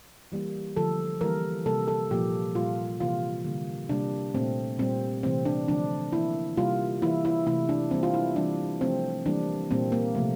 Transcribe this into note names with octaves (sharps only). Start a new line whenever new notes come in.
E3 G3 A#3
D3 F3 A3 A4
E3 G3 A#3 A#4
C3 G3 A#3 A4
A4
A#2 F3 A#3 G4
A#2 G3 A#3 F4
C3 E3 A#3 F4
D3 G3 A#3
C3 G3 A#3 D4
A#2 A3 C4
A#2 G3 A#3 C4
C3 E3 A3 C4
D4
D3 F3 A3 D4
E3 A#3 E4
C3 G3 A#3 F4
E3 A#3 E4
E4
C3 E3 A3 E4
D4
E3 G3 A#3 C4
F4
E4
E3 G3 A#3 D4
C3 F3 A3 C4
E3 G3 A#3 D4
A#2 G3 A#3 C4
A#3
C3 F3 A3